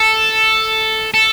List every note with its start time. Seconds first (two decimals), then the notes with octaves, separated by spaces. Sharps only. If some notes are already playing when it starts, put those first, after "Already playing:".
Already playing: A4
1.14 A4